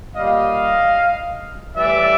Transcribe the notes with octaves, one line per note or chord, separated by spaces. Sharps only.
A#2 G3 D#5 F5
A2 E3 G3 D5 E5